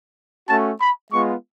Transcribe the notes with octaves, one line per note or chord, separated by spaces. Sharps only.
A3 C#4 F#4 A5
B5
G#3 B3 F4 C#6